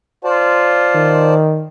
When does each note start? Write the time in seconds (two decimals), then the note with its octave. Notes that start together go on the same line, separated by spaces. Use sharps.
0.24 F4 C5 D5 A5
0.95 D#3